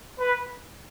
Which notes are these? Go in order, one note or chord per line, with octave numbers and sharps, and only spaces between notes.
B4